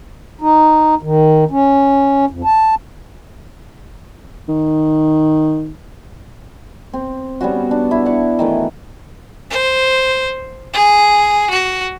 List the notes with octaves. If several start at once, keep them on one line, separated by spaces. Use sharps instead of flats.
D#4
D#3
C#4
F2
A5
D#3
C4
G3 B3 C#4 F#4
D4
E4
D5 F#5 A5 C#6
D#3 E3 A3
C5
G#4
F#4